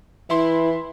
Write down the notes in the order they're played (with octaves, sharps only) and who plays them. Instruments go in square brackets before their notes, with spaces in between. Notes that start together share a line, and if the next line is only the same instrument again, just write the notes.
[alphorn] E3 [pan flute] E4 [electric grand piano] E5 C6